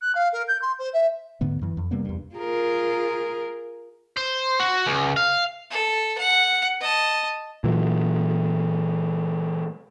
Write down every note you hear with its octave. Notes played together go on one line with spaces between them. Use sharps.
F#6
F5
A#4
G6
C6
C5
E5
D2 G#2 D3 B3
F#2 E3
F2
C3 G3 A#3 B3
E2 G2
F4 G#4 A#4
C5
F#4
C#2
F5
A4
F#5
D#5 A5
A#2 E3 F#3